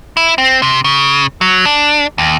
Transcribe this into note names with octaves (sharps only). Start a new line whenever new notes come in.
E4
C4
C3
C#3
F#3
D4
D#2